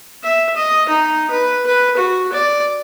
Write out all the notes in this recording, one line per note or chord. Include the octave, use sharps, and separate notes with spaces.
E5
D#5
D#4
B4
B4
F#4
D5